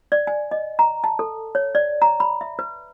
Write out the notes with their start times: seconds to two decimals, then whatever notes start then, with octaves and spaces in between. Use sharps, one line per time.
0.12 D5
0.27 G#5
0.51 D#5
0.79 A#5
1.04 A5
1.19 A4
1.55 C#5
1.75 D5
2.02 A#5
2.20 B5
2.41 E5
2.59 B4